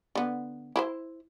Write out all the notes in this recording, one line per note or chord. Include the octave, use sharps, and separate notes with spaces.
D3 B3
E4 B4 C5